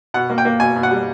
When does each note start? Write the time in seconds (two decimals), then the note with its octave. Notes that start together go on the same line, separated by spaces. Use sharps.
0.14 B2 F#5
0.30 A#3
0.38 G5
0.45 A#3
0.60 B2 G#5
0.76 B2
0.83 F#5
0.91 G3